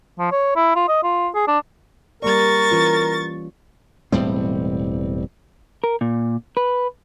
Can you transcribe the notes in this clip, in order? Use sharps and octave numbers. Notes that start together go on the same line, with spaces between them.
F3
C#5
E4
F4
D#5
F4
G#4
D4
G3 A#3 A#4 D5 C#6 A6
E3 C#4 F4
E1 A2 G3 C4
A#4
A#2
B4